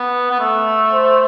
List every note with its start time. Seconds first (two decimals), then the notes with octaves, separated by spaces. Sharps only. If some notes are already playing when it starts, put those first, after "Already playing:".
Already playing: B3
0.31 B3
0.39 A3
0.94 C5